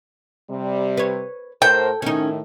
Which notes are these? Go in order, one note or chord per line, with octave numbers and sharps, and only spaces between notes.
C3 G3
B4 C#5
A2 A4 A#4 C5 G5
A2 D#3 C#4 D#4